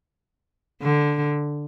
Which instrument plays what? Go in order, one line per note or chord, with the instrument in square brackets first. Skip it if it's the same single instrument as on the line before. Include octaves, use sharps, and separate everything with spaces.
[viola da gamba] D3